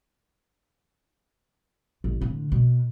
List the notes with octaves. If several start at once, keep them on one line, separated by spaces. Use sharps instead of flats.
A1
A2 D3
B2